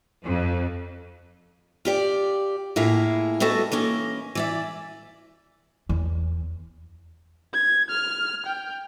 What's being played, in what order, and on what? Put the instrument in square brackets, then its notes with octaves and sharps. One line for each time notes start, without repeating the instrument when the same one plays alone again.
[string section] F2
[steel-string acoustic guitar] F4 G4 D5
A2 A#3 E4 F4 G#4
G3 A3 B3 F#4 A4 D#5
E3 A#3 C#4 D#5
E3 D5 E5
[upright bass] E2
[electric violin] G#6
F6
G5